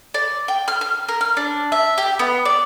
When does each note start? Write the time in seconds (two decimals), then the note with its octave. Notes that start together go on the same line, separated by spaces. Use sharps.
0.14 D5
0.48 G5
0.68 F6
0.81 F6
1.08 A#4
1.21 F6
1.37 D4
1.72 E5
1.98 G4
2.19 B3
2.45 D5